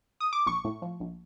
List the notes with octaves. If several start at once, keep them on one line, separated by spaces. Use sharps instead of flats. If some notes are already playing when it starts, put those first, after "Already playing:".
D#6
D6
A#1 C#6
A2
F3
A#1